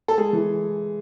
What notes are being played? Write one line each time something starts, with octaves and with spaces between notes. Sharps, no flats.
A4
G#3 G#4
E3